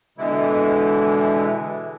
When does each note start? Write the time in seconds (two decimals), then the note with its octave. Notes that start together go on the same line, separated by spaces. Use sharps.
0.18 B2 D3 E3 G#3 E4